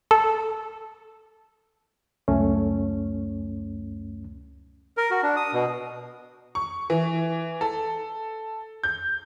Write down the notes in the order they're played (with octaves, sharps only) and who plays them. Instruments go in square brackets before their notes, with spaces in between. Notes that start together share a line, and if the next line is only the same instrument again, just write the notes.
[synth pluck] A4
[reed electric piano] C#2 F#2 A3 C#4
[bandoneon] A#4
F#4
D4
D#6
B2
[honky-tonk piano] C#6
E3
A4
G6